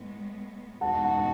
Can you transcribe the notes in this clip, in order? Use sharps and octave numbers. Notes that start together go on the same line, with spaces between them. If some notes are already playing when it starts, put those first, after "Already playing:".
Already playing: A2 G#3 B3
E2 B2 G#3 D#4 F#4 F#5 A5
F#5 A5
A5